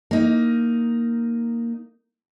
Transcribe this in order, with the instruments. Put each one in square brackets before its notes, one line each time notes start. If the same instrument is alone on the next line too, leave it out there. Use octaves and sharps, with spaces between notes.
[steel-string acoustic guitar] A#3 D#4